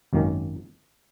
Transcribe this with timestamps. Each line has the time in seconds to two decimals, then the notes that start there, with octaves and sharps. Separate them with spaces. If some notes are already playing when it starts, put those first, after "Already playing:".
0.13 G#1 F#2 D#3 A#3 C#4